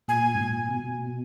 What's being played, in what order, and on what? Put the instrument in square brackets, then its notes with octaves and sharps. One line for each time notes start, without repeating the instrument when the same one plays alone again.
[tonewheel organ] A#2 [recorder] G#5
[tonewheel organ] G#2
A#2
B2